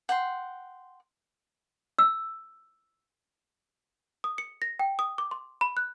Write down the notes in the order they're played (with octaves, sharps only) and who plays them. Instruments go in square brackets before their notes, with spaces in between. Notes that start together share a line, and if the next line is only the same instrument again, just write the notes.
[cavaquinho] F#5 G5 C6
[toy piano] E6
[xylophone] D#6
C#7
A#6
G5
D#6
D6
C6
B5
F#6